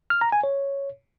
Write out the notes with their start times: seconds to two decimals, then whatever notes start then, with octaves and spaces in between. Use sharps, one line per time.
0.10 F6
0.21 A#5
0.32 G#5
0.43 C#5